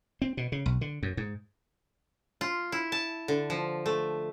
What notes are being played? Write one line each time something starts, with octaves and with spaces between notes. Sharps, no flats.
C4
B2
C#3
B1
D3
F#2
G#2
F4
E4
A5
D3
F3
A3